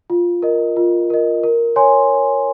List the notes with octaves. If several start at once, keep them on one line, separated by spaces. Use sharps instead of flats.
F4
A#4 D#5
F4
A#4 D#5
A#4
C#5 G#5 C6